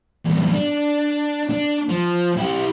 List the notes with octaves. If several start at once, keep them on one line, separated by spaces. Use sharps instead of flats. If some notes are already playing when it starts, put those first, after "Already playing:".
E2 G2
D4
D4
F3
E4 G4